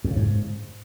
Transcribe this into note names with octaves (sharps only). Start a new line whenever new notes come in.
F2
C#3
G#2